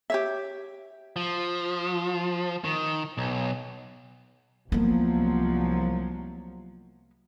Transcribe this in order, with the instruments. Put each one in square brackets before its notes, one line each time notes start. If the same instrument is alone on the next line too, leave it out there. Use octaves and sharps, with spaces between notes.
[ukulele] G4 C#5 E5
[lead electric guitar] F3
D#3
B1
[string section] C2 F3 F#3 [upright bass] A#3 B3